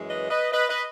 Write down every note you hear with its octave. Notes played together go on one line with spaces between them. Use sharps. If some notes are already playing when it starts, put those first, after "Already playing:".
Already playing: F#2 E3 G#3 C#4
B4 D#5
B4 D#5
B4 D#5
B4 D#5